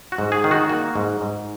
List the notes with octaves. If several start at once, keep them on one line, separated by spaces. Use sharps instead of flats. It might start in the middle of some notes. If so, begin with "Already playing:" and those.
F#4
G#2
G#4
D#3
F#4
A#3 F#4
G#2
G#2